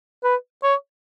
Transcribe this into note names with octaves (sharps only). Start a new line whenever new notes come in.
B4
C#5